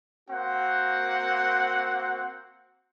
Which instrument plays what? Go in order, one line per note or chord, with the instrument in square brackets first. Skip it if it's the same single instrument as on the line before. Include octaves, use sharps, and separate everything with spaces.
[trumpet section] A#3 C4 F#4 F#5